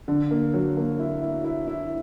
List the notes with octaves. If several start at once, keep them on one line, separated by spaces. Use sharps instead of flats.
D3
A#3
F#3
A#3
E4
E4
E4
E4